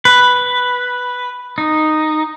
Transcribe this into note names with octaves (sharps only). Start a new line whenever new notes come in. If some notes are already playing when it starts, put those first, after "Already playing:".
B4
D#4